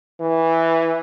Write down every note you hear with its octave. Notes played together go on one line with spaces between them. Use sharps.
E3